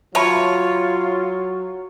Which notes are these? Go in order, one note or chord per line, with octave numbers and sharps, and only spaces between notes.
F#3 F4 C#5 E5 A5 B5